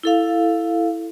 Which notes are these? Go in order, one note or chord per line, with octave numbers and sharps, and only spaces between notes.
E4 A4 F5